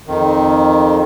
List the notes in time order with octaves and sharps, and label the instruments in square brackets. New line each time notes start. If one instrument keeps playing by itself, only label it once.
[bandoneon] F2 D#3